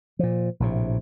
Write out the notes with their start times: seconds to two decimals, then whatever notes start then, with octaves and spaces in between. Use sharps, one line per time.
0.19 A#2 F3
0.60 A#1 A2 C3